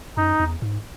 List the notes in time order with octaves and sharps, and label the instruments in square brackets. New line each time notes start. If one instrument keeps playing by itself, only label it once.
[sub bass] F#2 [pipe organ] D#4
[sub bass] E2
G#2